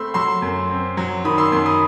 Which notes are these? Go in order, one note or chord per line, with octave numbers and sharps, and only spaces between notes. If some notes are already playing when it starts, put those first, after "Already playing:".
Already playing: A3 C4 B5 C6 E6
F#3 C6 E6
F#2
C4
F#3
D#3 B5 D#6
C6 E6
F#2 C6 E6
B5 D#6